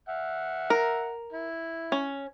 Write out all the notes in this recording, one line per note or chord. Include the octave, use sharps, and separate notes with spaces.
E5 F#5
A#4
E4
C#4